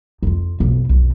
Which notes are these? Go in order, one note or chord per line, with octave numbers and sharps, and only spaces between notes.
F2 F4
B1 F2
B1 F2